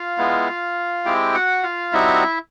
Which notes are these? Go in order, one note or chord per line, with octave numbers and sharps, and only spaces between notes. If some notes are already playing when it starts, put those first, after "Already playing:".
Already playing: F4 F5
G#3 B3 E4
G#3 C4 E4 G4 G5
F#4 F#5
F4 F5
G3 C4 D#4 E4 F#4 E5